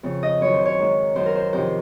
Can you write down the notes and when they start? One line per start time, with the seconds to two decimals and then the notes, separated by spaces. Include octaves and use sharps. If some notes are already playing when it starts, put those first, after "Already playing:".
0.03 F2 C#3
0.23 D#5
0.41 F#2 D#3 C#5
0.54 C5
0.65 C#5
0.78 G#2 D#3
1.15 F#2 D#3 C5
1.26 A#4
1.35 C5
1.53 F2 C3 D#3 C5